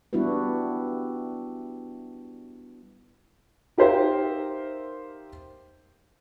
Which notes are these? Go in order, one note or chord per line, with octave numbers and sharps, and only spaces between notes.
G3 B3 D4 E4 F#4 B4
D#4 G4 A#4 C5 E5 F5